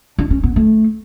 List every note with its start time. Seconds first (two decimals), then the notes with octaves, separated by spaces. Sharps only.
0.19 D4
0.30 C#4
0.43 B3
0.56 A3